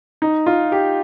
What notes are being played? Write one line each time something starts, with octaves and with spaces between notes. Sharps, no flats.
D#4
F4
G4